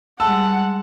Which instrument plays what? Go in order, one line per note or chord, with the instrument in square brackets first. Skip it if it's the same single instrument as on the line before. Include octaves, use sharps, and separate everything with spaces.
[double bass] G3 G#3 [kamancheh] F#5 [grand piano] A5 E6